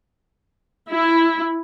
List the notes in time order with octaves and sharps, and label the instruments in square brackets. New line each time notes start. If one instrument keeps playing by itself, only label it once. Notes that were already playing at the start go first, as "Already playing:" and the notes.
[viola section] E4